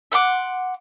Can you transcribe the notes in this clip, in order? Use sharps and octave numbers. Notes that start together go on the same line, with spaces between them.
E5 F#5 C6 D6